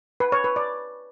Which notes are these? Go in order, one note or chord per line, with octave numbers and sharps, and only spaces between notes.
B4
C#5
B4
D5